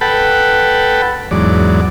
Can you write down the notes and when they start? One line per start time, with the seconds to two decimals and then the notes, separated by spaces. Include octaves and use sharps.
0.01 A4 B4 F#5 G5 A5 B5
1.31 E2 G#2 F#3 D5